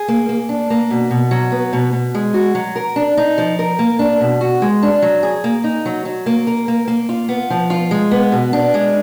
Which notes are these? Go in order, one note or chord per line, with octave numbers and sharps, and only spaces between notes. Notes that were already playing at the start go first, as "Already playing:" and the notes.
Already playing: G#4
A#3
A#3
D4
A#3
B2
B2
F#3
B3
B2
B2
G#3
F#4
F#3
A#4
D4
D#4
F3
A#4
A#3
D4
B2
F#4
G#3
D4
F#3
G#4
A#3
D#4
F#3
F#3
A#3
A#4
A#3
A#3
F4
B3
F3
F4
G#3
B3
B2
D4
G#3